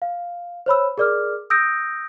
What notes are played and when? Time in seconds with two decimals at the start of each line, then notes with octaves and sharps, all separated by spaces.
0.02 F5
0.66 C5 C#5 B5 E6
0.98 G#4 A#4 D5 D6 F6
1.50 D#6 E6 G6 A#6 D7